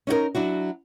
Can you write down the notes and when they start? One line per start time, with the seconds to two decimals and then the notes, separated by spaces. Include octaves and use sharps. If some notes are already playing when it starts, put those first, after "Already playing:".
0.07 C#4 D#4 F#4 A#4
0.35 F#3 D4 E4 F#4